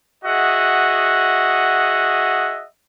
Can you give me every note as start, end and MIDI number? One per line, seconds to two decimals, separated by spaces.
0.25 2.65 66
0.25 2.65 68
0.25 2.65 75
0.25 2.65 76
0.25 2.65 78